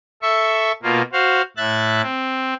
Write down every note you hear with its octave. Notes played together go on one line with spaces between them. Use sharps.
A4 E5 C#6
B2 A#3 F4
F#4 C5 F5
A2 E5 F#6 A6
C4